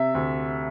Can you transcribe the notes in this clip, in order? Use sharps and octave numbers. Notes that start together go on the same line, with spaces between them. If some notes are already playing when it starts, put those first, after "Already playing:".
Already playing: C3 E5
D2